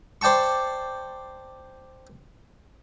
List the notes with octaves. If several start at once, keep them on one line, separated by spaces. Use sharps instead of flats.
C5 D5 G5 A5 C#6